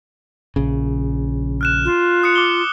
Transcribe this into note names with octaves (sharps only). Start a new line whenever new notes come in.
A#1 C#3
F6 F#6 E7
F4
D#6 F#6 C#7
D6 G7